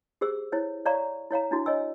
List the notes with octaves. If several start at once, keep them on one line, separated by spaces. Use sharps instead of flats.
G4 G#4 C5 E6
E4 C5 C#5
C#5 D5 F5 A#5 C#6
E4 C#5 F5 A#5
D4 E4 F#4
C#5 D#5 G#5 E6